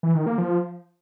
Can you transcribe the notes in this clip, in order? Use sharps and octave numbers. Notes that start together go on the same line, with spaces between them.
E3
D#3
A#3
F3